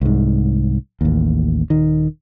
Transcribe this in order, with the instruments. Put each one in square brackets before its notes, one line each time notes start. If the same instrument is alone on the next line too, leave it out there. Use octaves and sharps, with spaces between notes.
[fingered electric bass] C2 G#2
A1 D#2
D#1 D#3